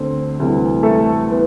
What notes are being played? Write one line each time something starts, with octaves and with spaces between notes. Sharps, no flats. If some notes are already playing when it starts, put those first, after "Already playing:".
Already playing: D2 D3 C4
D2 C3 E3 G3
A3 A4
E3 B3